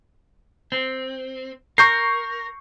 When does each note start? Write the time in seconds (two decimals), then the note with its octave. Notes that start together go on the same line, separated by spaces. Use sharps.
0.72 C4
1.78 A#4 C#6 G6 C7